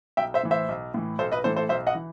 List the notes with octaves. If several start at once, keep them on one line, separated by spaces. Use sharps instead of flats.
B1 E5 G5
C5 E5
A2 E3
C5 E5
B1
A2 E3
B1 A4 C5
B4 D#5
A2 E3 A4 C5
A4 C5
B1 C5 E5
D#5 F#5
E3